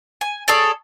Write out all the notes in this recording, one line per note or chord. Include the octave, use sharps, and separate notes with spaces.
G#5
G#4 A4 C#5 D5